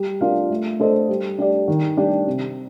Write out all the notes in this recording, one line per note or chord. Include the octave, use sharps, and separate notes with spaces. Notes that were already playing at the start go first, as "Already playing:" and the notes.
Already playing: G3
D4 F4 A#4 F5
A3
D4 A4 C5 D#5
G3
D4 G4 D5
D#3
G3 D4 G4
C3